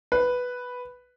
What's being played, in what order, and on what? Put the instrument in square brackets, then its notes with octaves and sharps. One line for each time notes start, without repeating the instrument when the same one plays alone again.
[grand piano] B4